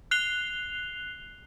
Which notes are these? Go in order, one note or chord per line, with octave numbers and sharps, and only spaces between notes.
F#6 C7 F7 G7